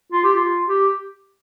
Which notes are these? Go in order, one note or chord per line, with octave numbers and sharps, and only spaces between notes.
F4
G4
F4
G4